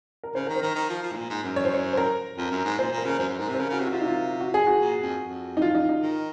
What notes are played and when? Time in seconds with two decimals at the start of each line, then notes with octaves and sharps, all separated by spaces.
0.23 A#4
0.35 C#3 C5
0.47 D#3 A#4
0.56 C5
0.62 D#3
0.75 D#3
0.89 F3
1.03 F3
1.12 G#2
1.16 A#2
1.30 G#2
1.43 F#2
1.56 C#5
1.65 C5
1.74 C#5
1.93 C5
1.97 A#4
2.38 F2
2.51 F#2
2.65 G#2
2.78 A#2 C5
2.92 A#2
2.98 A#4
3.05 C#3
3.09 A#4
3.19 F#2 C5
3.29 F#2
3.39 G#2 A#4
3.49 C3
3.54 C5
3.59 C#3 A#4
3.69 C#3
3.72 F#4
3.79 C3
3.87 F#4
3.89 C3 F4
4.01 D#4
4.08 F4
4.40 F#4
4.54 G#4
4.67 F#4
4.81 A#2
5.01 F2
5.21 F2
5.57 D#4
5.62 F4
5.75 D#4
5.89 D#4
6.02 D#3